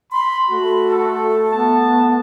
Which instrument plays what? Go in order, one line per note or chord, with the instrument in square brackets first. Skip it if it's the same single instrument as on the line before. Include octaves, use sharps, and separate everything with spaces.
[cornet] B5 [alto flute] C6
[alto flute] A3 [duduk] F#4
[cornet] A4
[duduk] B3 [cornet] A5